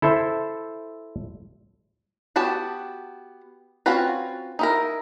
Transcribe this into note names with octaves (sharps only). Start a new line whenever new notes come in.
E4 A4 C5 E5
B3 F#4 G4 A5
C4 C#4 F4 F#4 B4
D#4 E4 A#4